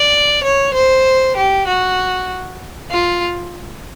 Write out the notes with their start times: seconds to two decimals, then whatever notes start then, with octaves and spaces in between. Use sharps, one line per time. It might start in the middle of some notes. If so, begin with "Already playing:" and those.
Already playing: D5
0.43 C#5
0.74 C5
1.37 G4
1.67 F#4
2.91 F4